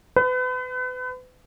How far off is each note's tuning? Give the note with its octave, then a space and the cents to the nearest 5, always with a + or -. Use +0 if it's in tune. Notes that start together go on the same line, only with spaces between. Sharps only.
B4 +35